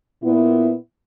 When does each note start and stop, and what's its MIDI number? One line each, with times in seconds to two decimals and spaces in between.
0.23 0.73 46
0.23 0.73 59
0.23 0.73 64